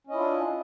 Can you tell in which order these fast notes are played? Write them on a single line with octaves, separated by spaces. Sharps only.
C#4 D#5 E4 F4 D4